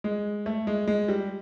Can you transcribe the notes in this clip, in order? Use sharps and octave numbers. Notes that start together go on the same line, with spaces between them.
G#3
A3
G#3
G#3
G3